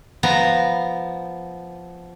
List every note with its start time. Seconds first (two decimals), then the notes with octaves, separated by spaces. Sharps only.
0.23 F3 B3 A#5